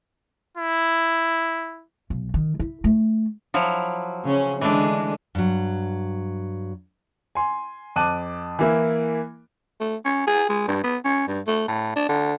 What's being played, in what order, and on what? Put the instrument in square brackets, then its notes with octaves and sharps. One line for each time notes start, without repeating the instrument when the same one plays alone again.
[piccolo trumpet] E4
[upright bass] B1
D#3
E4
A3
[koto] F3 F#3 E4
[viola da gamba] C#3 C#4
[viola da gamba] D3 G#3 [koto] E3 A3 D4
[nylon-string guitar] G2 F#3
[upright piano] G#5 C6
F2 A5 D6 F#6 D#7
E3 A#3 E4
[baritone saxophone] A3
C#4
G#4
G#3
G2
B3
C#4
G2
A3
A2
D4
D3